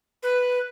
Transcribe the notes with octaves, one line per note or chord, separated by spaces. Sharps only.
B4